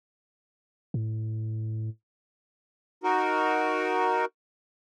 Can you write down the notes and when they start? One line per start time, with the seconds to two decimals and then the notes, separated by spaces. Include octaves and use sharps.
0.94 A2
3.03 D#4 F#4 A#4